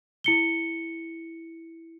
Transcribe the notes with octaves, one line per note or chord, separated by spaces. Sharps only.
E4 C#7 G7